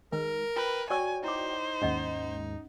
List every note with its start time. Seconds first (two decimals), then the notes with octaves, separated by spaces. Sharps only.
0.12 D#3 G#3 A#4 B4
0.56 F4 B4 G5
0.90 F#4 C#5 D5 G5 G#5 C#6 E6
1.24 D#4 E4 C5 D6
1.82 D#2 G#2 C#4 D#5 F#5